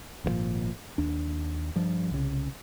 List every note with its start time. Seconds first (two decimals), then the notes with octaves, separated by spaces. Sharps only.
0.24 G#1 G2 A#2 F3
0.98 D#2 D4
1.76 G2 F3
2.11 C2 C#3